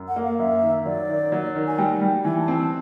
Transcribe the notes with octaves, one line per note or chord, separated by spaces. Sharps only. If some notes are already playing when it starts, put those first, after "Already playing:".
Already playing: F#2
F#5
A#3
F5
F#2 E5
D#3
F#3 D5
D#3
F#3
D#3
G#5
G3 G5
G3
E3 G#5
A5
C4
A5